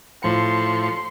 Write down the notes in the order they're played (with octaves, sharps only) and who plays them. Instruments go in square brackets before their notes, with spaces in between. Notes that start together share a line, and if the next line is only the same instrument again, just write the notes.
[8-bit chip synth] A2 F3 C#7 [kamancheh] C6